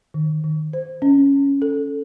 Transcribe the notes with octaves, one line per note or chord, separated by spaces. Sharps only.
D#3
D#3
C5
C#4
C#4
A4